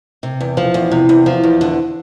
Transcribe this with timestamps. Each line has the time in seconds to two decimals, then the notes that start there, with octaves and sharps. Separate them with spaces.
0.23 C3
0.41 E2
0.57 F3
0.74 E2
0.91 C3
1.09 E2
1.26 F3
1.44 E2
1.61 D3